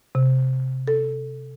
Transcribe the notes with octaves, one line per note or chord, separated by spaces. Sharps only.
C3
A4